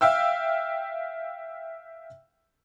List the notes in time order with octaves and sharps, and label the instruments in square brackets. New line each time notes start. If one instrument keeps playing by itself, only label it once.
[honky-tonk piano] E5 F5 G5 E6